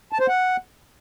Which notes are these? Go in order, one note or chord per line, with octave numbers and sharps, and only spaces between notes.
A5
C5
F#5